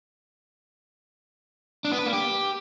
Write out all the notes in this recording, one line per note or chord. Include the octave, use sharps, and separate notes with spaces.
D4
B3
B4
A#3
G4